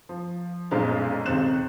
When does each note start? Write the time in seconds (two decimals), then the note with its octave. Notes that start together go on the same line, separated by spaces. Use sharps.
0.09 F3
0.71 B1 F#2 A#2 G#3 C5 F5
1.26 D#2 C3 C4 F#6 E7